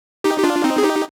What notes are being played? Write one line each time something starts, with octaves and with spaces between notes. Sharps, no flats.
D#4 G4
G4
D4 F4
C4 D#4
G#4
D#4 G4